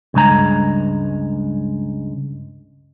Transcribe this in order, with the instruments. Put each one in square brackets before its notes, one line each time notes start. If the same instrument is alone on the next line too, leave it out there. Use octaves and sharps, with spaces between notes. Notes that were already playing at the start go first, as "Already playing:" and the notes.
[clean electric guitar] C#2 G2 G#3 A#5